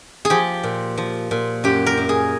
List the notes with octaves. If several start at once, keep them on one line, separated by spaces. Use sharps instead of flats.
G#4
F3 G4
A#2
F3
A#2
F#2 G4
A#4
F#2
G#4